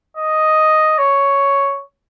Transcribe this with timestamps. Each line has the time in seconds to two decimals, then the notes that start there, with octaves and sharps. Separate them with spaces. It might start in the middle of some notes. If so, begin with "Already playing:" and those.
0.17 D#5
0.98 C#5